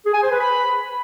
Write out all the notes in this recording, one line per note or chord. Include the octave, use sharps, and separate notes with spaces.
G#4
G#5
C5
B4
B5